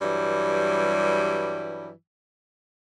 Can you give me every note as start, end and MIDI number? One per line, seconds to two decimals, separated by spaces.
0.01 1.90 43
0.01 1.90 52
0.01 1.90 54
0.01 1.90 55